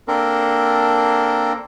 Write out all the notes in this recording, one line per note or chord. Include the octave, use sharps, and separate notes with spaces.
A#3 C4 D4 A4 A#4